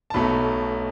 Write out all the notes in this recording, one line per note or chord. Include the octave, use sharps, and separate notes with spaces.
A5
B1 B2 F#3 A3 B5